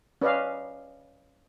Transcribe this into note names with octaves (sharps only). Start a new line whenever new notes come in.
C#4 B4 D5 D#5 F5